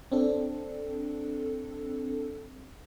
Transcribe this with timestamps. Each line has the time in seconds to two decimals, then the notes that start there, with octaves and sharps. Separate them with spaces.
0.12 C4 D4 A4